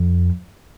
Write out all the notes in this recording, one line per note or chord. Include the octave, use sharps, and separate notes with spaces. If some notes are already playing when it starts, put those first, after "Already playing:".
Already playing: F2